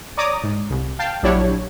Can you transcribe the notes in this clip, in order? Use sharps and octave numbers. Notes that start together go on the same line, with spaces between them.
C#5 D5 A#5 D6 D#6
G#2
C2
F5 G5 A5
A#1 F#3 D4 E4 G4 C#5